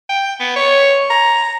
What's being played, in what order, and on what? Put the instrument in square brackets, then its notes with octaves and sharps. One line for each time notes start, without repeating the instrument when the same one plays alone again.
[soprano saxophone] G5
B3
C#5
A#5